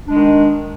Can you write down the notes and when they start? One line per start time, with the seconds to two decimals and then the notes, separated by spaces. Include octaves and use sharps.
0.06 D4
0.11 G#3
0.15 D#3